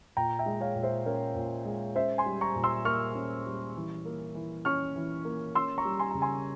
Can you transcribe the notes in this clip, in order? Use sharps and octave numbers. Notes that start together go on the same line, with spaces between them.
A#2 G5 A#5
E5 G5
G#3
C#5 F5
A#2
C5 E5
C#4 A#4 C#5
A#2
G#3
C#4 C5 E5
G#5 C6
G3
A#5 C#6
A#2
C6 E6
A#3 C#6 F6
C#4
G3
E3
A#3
E3
C#4 C#6 F6
E3
A#3
C#4 C6 E6
A#5 C#6
G3
G#5 C6
C#3 A#5
G#5 C6